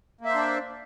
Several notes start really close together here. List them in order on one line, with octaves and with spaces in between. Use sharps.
A#3 E5 C5 D4